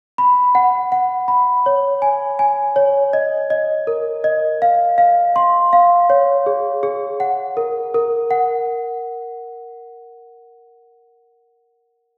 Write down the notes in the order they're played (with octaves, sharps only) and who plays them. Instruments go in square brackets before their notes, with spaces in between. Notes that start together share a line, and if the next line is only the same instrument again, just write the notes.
[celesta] B5
F#5
F#5
B5
C#5
G#5
G#5
C#5
D#5
D#5
A#4
D#5
F5
F5
C6
F5
C#5
G#4
G#4
F#5
A#4
A#4
F#5